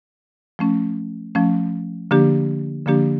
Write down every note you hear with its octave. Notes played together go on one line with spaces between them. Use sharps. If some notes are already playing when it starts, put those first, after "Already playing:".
F3 A3 C#4
F3 A3 C#4
D3 F3 A#3 D4 G4
D3 F3 A#3 D4 G4